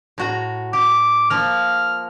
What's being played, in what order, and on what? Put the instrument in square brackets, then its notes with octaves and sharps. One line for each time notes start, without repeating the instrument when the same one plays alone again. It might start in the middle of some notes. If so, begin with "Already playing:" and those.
[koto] A2 F#4 A#5
[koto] G4 [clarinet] D6
[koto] F3 A#3 [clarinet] F6